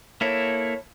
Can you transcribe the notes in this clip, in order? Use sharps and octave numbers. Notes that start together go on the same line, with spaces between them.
A#3 E4 A4 C#5